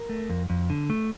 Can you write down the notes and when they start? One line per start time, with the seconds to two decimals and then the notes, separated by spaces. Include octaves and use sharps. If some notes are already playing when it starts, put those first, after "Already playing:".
Already playing: A#4
0.09 A3
0.29 F2
0.50 F2
0.70 D3
0.90 A3